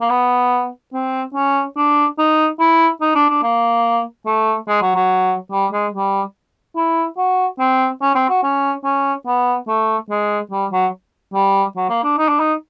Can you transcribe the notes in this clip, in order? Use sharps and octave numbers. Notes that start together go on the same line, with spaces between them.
A#3
B3
C4
C#4
D4
D#4
E4
D#4
D4
D4
A#3
A3
G#3
F#3
F#3
G3
G#3
G3
E4
F#4
C4
C#4
C4
F#4
C#4
C#4
B3
A3
G#3
G3
F#3
G3
F#3
A#3
D4
D#4
D4
D#4